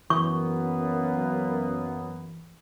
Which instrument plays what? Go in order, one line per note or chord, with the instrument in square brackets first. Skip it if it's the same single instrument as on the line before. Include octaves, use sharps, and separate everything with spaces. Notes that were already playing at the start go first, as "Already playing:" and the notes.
[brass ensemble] F#2 A#3 B3 [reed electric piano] E3 [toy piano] C#6